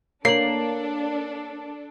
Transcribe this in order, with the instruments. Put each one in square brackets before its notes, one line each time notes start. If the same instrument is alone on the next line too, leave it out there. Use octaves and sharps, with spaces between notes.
[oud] A#3 [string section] D4 A4 [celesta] C#5 F#7 [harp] C7